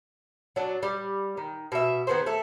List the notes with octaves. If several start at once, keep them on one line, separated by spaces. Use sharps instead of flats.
F#3 D4
G3
D#3
B2 E5
D#3 B3 G#4 C5
A3 A4